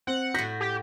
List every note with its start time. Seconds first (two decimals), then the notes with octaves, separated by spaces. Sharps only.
0.07 C4 F#5
0.34 A2 F#4 G6 A#6 B6
0.60 G4